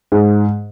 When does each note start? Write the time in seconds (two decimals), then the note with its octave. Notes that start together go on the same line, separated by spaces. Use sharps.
0.12 G#2